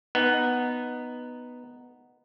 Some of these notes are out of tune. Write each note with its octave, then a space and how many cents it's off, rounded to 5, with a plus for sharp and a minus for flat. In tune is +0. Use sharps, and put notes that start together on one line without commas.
B3 +0 D#4 -5